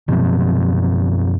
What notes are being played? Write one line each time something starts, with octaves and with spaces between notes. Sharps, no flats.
F#2 B2 F3 C4